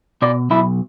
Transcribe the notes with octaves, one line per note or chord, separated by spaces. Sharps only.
B2 D5
B1 E4